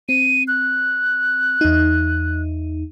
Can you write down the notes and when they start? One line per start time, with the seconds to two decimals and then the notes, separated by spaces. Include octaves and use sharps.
0.09 C4 D#7
0.48 F#6
1.61 E2 D#4